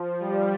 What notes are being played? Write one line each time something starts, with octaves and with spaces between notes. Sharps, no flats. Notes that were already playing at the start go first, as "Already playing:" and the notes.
Already playing: F3
G3